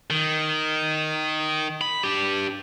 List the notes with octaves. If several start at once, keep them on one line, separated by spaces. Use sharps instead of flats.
D#3
B5
D4 G4